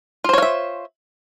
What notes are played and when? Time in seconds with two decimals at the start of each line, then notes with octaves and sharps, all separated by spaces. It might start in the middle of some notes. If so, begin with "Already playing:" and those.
0.24 F4
0.29 C5
0.33 C#5
0.38 F5
0.42 E5